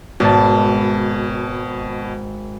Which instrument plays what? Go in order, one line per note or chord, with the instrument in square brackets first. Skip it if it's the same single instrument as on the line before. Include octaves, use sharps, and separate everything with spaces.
[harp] G#1 A5 [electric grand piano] B2